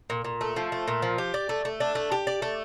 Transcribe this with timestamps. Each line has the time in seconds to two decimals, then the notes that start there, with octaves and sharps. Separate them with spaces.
0.10 A#2
0.25 A#2
0.41 A3
0.56 F3
0.72 A3
0.88 A#2
1.02 F3
1.18 G4
1.34 D5
1.49 A3
1.65 A3
1.80 D4
1.95 A3
2.12 G4
2.27 D5
2.42 A3